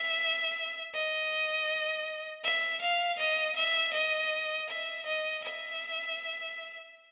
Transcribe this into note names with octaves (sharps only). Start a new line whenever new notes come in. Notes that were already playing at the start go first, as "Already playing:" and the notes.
Already playing: E5
D#5
E5
F5
D#5
E5
D#5
E5
D#5
E5